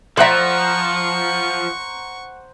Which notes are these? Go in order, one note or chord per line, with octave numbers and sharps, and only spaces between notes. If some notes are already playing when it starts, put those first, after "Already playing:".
F3 C5 D5 E5 F#5 A#5 C#6